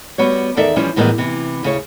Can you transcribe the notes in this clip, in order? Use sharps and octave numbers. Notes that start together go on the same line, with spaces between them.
G3 B3 F#4 C#5
E2 D#3 A4 D5 E5
E3 F3 G3 C#4
A2 D#3 E3 G3 G#3 B3
C3 E3
D2 C#3 E4 C#5